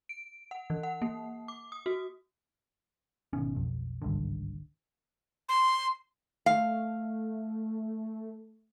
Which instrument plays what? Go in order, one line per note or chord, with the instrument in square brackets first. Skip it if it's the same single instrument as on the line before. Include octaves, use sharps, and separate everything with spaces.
[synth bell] D7
F#5
E3
F#5
A#3
D6
D#6
F#4
[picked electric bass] G#1 B2 D#3 C#4
B1 F2
G#1 C#2 G2 D3
[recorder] C6
[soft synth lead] A3 [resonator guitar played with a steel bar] F5